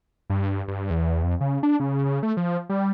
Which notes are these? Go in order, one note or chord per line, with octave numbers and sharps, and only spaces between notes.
G2
G2
E2
F2
C#3
D4
C#3
C#3
A3
F3
G3